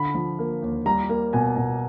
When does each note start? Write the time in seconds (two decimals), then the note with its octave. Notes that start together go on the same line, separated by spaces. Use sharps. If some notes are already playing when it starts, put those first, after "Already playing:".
Already playing: D3 B5
0.14 F3
0.39 A#3
0.62 D#2
0.86 G3 A#5
1.09 A#3
1.33 B2 G#5
1.56 B2